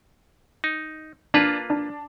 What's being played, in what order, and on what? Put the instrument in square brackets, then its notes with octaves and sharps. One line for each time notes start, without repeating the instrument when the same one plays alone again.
[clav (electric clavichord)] D#4
[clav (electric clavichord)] A#3 F4 B4 [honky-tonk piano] D4
[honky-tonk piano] D4